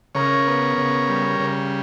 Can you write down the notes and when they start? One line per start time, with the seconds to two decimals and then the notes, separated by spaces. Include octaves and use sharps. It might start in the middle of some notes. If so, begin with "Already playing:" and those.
0.15 C#3 A#4 C#5
0.47 B3
0.78 C#3
1.09 G3
1.40 C#3